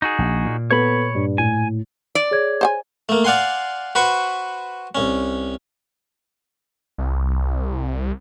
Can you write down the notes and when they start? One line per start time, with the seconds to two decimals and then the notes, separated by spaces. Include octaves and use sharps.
0.02 D#4 F#4 G#4
0.19 A#1
0.45 A#2
0.71 B3 A4 C#5 B5
1.15 G2
1.38 A2 G#5
2.15 D5
2.31 G#4 C#5 G#6
2.61 C5 F#5 G#5
3.09 A3 A#3
3.24 D5 F5 F#5 G#5 C6
3.95 F#4 B4 C5 B5 C#6
4.95 C2 C#4
6.98 C2